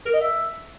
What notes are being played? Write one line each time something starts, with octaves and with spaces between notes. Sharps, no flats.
A#4
D#5
E5